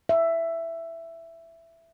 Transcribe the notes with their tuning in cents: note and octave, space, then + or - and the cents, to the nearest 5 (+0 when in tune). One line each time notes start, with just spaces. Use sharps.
E5 +10